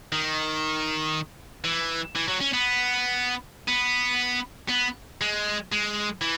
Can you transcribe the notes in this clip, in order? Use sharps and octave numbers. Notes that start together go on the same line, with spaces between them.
D#3
E3
E3
F#3
C#4
B3
B3
B3
G#3
G#3
E3